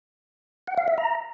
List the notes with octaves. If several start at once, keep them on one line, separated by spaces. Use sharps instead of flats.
F#5
F5
E5
A#5